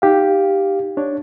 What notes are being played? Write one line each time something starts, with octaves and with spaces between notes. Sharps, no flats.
D#4 G4 F5
D4 C#5